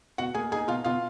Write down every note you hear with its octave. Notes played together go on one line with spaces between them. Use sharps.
B2 F#4 F#5
A#3 G#4 G#5
D#4 G#4 G#5
B2 F4 F5
B2 F4 F5